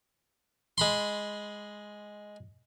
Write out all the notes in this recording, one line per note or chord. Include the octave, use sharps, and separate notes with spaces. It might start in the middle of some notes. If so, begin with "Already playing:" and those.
G#3 B5 C6